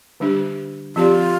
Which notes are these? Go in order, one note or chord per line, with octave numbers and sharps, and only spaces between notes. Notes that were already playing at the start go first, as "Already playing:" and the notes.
D3 G3 D4 G4
F3 C4 F4 G4 D5